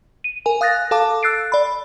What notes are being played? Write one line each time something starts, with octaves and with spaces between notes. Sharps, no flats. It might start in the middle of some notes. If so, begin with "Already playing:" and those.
D#7
A#4 G#5
F5 D#6 F#6 A6 A#6
A4 F5 A5 D6
E6 F#6 A6 C7 D7
D5 B5